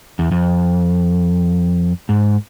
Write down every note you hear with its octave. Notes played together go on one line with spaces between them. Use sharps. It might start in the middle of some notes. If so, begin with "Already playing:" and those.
E2
F2
G#2